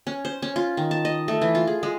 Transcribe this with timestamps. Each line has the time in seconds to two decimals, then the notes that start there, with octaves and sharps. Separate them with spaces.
0.07 C#4
0.25 C5
0.42 C#4
0.56 F4
0.77 D#3
0.91 A5
1.05 D#5
1.28 A3
1.41 E3
1.55 F4
1.67 G#4
1.83 G#3